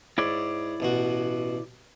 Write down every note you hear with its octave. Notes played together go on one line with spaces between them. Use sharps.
G#2 E4 C#5 D5
A1 B2 F#4